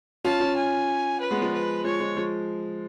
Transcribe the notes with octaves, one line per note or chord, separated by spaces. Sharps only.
C#4 F4 A5
C#4 F4
G#5
B4
G#3 B3
F3 G#3
B4
F3 G#3 C#5
F3 G#3
F3 G#3